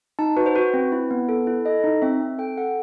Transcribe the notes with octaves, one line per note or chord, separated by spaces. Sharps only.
D#4 A5
F#4 B4
C5
F#4 B4
C4
E4
B3
A4
E4
A4 D#5
D#4
C4 E5
C4
A4 G5
A4 F#5